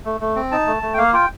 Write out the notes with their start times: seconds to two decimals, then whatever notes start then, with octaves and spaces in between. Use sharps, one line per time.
0.05 A3
0.21 A3
0.36 C4
0.52 D#4 A5
0.67 A3
0.83 A3
0.94 G5
0.98 A#3 F5
1.13 F4 G5